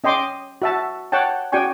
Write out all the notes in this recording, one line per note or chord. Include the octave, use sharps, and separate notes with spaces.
C#4 D#5 G5 C6 D6
F#4 E5 A5
C#5 F#5 G5 A5
C#4 F#4 D5 G5 G#5 C#6